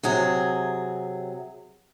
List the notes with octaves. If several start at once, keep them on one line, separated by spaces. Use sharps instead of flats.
C3 F#3 G#4